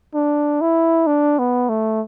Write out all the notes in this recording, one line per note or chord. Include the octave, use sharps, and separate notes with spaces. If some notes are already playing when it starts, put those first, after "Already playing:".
D4
E4
D4
B3
A3